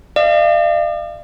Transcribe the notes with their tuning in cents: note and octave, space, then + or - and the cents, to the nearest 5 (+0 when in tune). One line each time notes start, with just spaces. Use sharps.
D5 +45 F5 -35